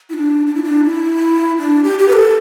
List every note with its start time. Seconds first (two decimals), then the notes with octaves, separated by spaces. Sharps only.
0.09 E4
0.14 D4
0.47 D4
0.55 E4
0.63 D4
0.85 E4
1.58 D4
1.84 G4
1.99 G4
2.08 B4
2.13 A4